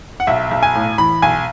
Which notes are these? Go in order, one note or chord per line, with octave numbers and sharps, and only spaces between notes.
F#5
B1 E5
B1
G#5
A2
E3 B5
B1 G#5